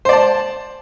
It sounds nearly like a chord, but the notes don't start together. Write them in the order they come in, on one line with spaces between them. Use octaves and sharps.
C5 D5 A5